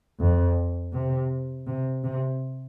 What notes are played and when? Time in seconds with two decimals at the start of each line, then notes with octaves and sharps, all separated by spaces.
0.20 F2
0.93 C3
1.67 C3
2.04 C3